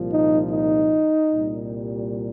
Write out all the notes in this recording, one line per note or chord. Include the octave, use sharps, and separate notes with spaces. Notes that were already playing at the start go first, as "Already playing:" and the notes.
Already playing: C2 A#2 F3
D#4
D#4
C2 A#2 G3